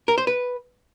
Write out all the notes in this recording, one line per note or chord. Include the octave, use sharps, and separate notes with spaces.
A#4
C5
B4